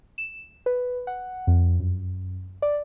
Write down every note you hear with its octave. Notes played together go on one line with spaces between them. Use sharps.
E7
B4
F#5
F2
F#2
D5